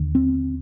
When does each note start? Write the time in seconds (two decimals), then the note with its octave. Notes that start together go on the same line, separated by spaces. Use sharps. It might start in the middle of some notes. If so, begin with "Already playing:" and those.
Already playing: D#2 D3
0.15 C4